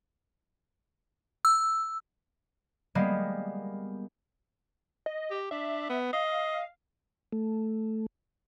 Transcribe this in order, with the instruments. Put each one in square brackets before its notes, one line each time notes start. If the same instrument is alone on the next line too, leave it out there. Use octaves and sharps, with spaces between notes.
[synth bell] E6
[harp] G3 G#3 A#3 B3
[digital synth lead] D#5
[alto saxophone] G4
[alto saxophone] D4 [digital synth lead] E5
[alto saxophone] B3
[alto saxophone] D#5 [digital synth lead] F5
[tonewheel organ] A3